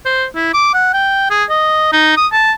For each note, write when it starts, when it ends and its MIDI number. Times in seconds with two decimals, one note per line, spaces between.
0.05 0.26 72
0.35 0.53 64
0.54 0.69 86
0.74 0.91 78
0.93 1.29 79
1.31 1.44 68
1.50 1.88 75
1.93 2.14 63
2.17 2.27 87
2.32 2.52 81